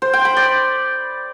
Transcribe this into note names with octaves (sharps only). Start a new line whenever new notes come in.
C5
G5
B5
D5